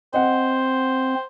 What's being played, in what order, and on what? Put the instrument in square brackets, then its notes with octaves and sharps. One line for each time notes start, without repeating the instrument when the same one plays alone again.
[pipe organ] C4 [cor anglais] C5 [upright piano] D#5 F#5